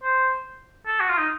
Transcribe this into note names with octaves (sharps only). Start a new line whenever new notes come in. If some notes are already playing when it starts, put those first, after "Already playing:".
C5
A4
F#4
F4
D#4